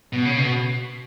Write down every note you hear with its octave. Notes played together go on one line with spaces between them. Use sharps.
B2
C#3
B2